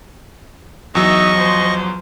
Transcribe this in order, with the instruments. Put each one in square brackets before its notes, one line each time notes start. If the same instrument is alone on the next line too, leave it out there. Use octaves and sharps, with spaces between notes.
[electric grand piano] E2 F#3 [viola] D#4 E5 [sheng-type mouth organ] D#5 C#6
[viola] F3 C5